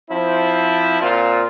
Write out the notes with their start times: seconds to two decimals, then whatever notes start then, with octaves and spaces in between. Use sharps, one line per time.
0.10 F3 C4 E4
1.01 A#2 C4 F4